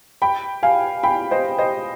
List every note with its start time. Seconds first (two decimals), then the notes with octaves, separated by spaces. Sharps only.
0.22 G5 B5
0.63 F5 G#5
1.03 G5 B5
1.31 C5 D#5
1.58 C5 D#5